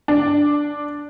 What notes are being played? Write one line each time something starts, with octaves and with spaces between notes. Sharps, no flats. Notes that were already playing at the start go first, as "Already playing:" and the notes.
D4